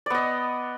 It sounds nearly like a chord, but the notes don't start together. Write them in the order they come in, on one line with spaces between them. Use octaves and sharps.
D5 B3 D#5